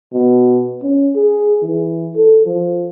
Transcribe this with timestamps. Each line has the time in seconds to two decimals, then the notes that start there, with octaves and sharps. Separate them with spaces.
0.14 B2
0.83 C#4
1.16 G#4
1.62 E3
2.16 A4
2.46 F3